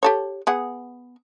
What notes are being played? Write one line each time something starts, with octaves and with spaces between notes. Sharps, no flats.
G4 A4 C#5
B3 G#4 F#5